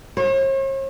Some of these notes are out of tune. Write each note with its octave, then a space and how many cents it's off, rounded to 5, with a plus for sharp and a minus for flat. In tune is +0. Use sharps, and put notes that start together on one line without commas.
C#5 -45